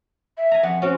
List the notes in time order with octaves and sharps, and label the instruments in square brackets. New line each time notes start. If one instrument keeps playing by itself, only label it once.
[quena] E5
[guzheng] G#5 A#5
[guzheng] F2 [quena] F#5
[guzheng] C4 C#4 [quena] F#4